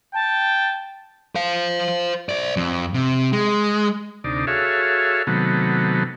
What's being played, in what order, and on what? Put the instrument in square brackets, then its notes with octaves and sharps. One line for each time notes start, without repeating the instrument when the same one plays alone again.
[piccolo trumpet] G5 [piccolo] A5
[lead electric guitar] C5 F5
C5 D5
F2
C3
G#3
[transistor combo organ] D2 C3 D#4 D5
F#4 G#4 A4 C#5 E5 F5
C3 D#3 F#3 A3 B3